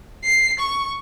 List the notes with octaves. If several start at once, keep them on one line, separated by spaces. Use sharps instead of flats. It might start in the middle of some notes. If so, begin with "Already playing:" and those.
C7
C#6